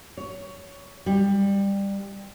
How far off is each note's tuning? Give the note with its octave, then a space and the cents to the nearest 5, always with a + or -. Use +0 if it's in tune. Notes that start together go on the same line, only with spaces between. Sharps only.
C#5 +20
G3 +15